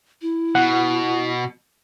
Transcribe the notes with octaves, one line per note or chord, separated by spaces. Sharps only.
E4
B2 F#5